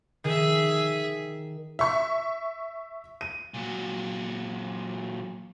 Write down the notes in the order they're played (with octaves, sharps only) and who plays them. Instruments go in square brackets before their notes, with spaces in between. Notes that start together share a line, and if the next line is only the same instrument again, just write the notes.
[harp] D#3 [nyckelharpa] G#4 E5
[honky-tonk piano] E5 C#6
D#7
[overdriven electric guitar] A#2 F#3